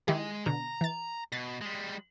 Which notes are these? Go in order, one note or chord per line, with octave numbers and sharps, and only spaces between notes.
D#3 G#3 E4 G4
B2 D3 A#5
E3 A6
B2 A6
G3 G#3